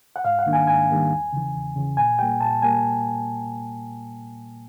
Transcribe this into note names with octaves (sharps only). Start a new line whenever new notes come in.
F#5
G#2 F5
F#5
D#3 G3 A#3 D4
G#5
G#2 G#5
D#3 G3 A#3 D4
E2
C#3 E3
E2
C#3 E3
A#2 G#5
G3 A#3 G5
A#2 A5
G3 A#3 G#5